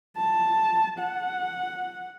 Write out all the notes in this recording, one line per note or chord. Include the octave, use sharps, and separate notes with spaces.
A5
F#5